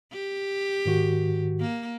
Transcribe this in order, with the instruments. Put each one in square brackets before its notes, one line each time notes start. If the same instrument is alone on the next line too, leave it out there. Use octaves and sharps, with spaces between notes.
[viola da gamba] G4
[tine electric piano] G#2 D#3 F#4
[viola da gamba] A#3